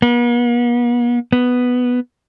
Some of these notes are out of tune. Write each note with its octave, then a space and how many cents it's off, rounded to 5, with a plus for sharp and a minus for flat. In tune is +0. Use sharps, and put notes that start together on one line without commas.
B3 -45
B3 +0